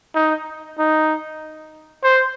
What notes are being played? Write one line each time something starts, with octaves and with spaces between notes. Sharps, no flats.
D#4
D#4
C5